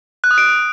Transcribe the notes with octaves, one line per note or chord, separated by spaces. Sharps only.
F#6
D#6
D7